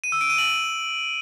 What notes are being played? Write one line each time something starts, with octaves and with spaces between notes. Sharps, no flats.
D#7
E6
D7
D#7
F#7